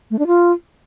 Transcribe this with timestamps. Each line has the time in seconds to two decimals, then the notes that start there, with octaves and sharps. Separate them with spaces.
0.11 A3
0.19 D4
0.27 F4